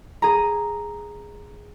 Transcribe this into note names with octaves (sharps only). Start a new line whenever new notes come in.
G#4 A#5